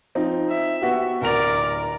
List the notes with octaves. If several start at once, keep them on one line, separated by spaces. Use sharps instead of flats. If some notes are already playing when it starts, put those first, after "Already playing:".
F3 C4 D#4
E5
B3 F#4 G4
D1 A#4 D5 F7